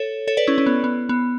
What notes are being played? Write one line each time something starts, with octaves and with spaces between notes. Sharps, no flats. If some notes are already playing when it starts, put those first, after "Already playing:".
Already playing: A4 C#5
A4 C#5
B4 D5
C#4 E4
C#4
B3
B3
B3